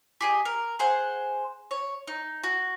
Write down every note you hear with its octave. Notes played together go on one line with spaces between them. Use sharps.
G4 G#4 D#5
A#4
G#4 C5 F#5
C#5
D#4
F#4